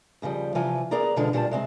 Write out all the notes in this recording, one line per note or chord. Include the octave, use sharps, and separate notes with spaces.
D#2 C#3 F3 G3
C3 E3 F3 F4 G#5
B3 G#4 A#4 D5 A#5
B2 D3 F3 G#3 D4 F4
A#2 G3 F4 A5
C3 G#3 C4